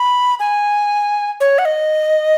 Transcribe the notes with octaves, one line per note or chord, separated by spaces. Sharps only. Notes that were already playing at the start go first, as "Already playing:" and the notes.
Already playing: B5
G#5
C#5
F#5
D#5